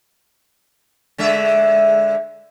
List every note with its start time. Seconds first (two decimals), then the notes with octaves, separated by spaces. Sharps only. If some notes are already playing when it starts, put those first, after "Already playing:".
1.18 D3 G#3 E5